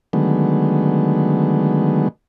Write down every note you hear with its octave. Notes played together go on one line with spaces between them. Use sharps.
D3 D#3 F#3 G#3 A3 B3